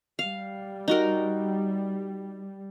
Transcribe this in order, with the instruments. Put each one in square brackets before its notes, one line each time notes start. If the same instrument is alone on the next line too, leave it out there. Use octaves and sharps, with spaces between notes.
[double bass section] G3 [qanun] F5
[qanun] D#4 F#4 A#4